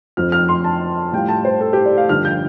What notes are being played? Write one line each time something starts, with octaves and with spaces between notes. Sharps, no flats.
F2 F3 C4 F6
F6
C6
A5
A2 G3 F4 G5
A5
C5
A4
G4
D5
F5
G1 G2 F3 F6
G6